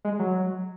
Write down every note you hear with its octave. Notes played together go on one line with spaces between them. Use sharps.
G#3
F#3